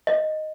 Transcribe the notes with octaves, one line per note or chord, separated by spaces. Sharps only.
D#5